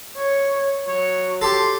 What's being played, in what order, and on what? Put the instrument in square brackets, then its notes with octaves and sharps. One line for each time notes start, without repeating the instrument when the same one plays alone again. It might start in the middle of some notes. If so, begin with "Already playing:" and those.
[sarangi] C#5
[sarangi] F#3 [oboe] C#5
[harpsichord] G4 A4 [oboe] C6